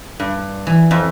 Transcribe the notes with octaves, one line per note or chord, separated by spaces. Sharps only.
G2
E3
F2